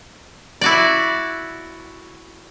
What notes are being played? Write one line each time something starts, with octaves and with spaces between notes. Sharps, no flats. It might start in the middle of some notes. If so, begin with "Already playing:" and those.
E4 F#4 D5